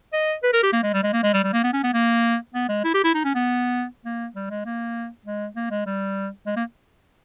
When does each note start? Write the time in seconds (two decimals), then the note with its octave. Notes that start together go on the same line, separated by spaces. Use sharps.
0.13 D#5
0.43 B4
0.53 A#4
0.63 G4
0.73 A#3
0.83 G#3
0.93 G3
1.03 G#3
1.13 A#3
1.23 G#3
1.33 G3
1.44 G3
1.53 A#3
1.64 B3
1.73 C#4
1.83 B3
1.93 A#3
2.54 B3
2.69 G#3
2.84 E4
2.94 G4
3.04 E4
3.14 D#4
3.24 C#4
3.35 B3
4.05 A#3
4.35 G3
4.50 G#3
4.65 A#3
5.26 G#3
5.56 A#3
5.71 G#3
5.86 G3
6.46 G#3
6.56 A#3